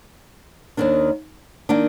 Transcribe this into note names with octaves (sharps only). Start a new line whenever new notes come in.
D#2 D#3 A#3 D4
D#3 A#3 D4